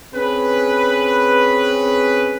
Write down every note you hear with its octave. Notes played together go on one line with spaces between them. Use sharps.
C4 C#4 G#4 B4